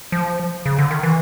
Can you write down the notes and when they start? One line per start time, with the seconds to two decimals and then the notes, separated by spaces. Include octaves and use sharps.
0.12 F3
0.66 C#3
0.79 D3
0.91 D#3
1.03 E3